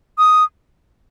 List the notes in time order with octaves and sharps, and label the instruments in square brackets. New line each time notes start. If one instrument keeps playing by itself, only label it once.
[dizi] D#6